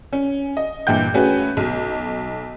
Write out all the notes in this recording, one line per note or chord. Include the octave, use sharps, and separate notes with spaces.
C#4
D#5
G2 A#2 E3 G5 G6
A3 C#4 F#4 G#4 B4
B1